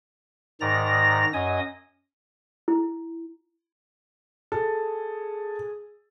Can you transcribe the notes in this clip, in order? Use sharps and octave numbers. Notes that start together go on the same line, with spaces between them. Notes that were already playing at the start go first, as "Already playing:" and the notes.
G#2 D#3 D5 A#5 A#6
F#2 D#5 G#5 D#6
E4
G#4 A4